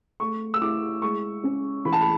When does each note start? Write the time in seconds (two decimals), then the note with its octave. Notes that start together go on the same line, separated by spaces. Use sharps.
0.20 A3 C#6
0.54 E6
0.62 E4 D6
1.02 G#3 C#6
1.44 C#4
1.85 E3 B5
1.92 A5
2.01 B5